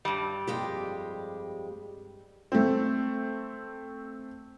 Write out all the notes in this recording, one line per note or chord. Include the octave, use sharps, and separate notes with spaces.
G2 G3
F2 G#3 G4
A3 C4